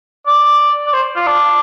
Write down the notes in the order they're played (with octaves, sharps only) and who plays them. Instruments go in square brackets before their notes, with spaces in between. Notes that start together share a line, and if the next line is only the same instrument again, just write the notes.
[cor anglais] D5
D5
C5
F4
D4